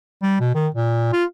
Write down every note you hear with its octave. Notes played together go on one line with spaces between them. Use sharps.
G3
B2
D#3
A#2
F4